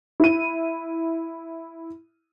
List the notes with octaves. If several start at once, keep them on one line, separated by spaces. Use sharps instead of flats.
E4 D#7